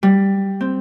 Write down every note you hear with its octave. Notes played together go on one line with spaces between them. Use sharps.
G3
C4